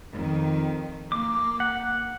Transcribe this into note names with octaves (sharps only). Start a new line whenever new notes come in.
F2 D#3
A#3 D6
F#5